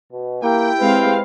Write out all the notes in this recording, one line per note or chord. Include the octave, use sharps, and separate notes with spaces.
B2
A#3 E4 G4 G5
G#3 C4 B4 F5